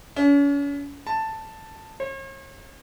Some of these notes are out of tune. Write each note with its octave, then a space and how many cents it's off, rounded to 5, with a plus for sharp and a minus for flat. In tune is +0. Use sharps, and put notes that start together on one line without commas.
C#4 +40
A5 +5
C#5 -45